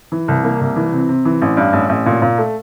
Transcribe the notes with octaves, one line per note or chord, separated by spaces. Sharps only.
E3
C2
A#3
C2
E3
C3
C3
E3
A1
G2
A1
A1
A#2
A#2
A3